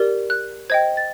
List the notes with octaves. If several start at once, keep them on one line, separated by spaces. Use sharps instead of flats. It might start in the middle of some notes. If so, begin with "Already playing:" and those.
Already playing: G4 A#4 D5
F#6
C5 D#5 G5 G#6
A6